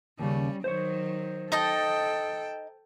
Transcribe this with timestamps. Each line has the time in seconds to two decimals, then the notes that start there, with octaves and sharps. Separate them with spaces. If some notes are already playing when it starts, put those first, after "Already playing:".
0.19 D#2 A2 C#3 G3 C#4
0.64 D#3 F#3 C5 C#5
1.52 D#4 A4 D#5 G5 A5